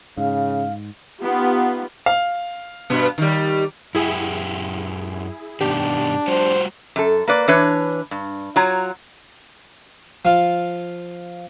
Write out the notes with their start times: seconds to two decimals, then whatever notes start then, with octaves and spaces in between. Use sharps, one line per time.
0.18 G#2 C#3 F5
1.20 B3 D#4 F4 G4
2.06 F5
2.90 G2 B2 B3
3.18 D#3 G3
3.95 F#2 E4 G4 G#4 F#5
5.61 G2 B2 D#3 D4 G4
6.28 G3 F4 F#4 C5
6.96 F#2 A4
7.28 A#3 B4 D5
7.48 E3 D4 B4 C#5
8.11 G2
8.56 F#3 F4 C#5 A#5
10.25 F3 F4